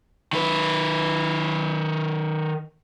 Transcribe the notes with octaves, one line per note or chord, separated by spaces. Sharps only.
D#3 B4